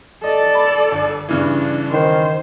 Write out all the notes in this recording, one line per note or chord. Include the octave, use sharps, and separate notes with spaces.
A4 D5 D#5
B5
G1
G2 C#3 E3 D4
D#3 C5